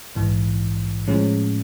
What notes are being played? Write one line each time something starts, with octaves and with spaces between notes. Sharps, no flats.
A#1 G#2 E3
A2 F3 G#3 C#4